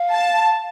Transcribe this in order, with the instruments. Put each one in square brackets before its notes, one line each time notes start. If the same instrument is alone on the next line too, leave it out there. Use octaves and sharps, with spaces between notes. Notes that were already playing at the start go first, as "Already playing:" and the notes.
Already playing: [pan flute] F5
[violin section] A5